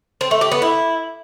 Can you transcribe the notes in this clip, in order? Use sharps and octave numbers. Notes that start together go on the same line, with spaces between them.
C4
A3
G4
B3
E4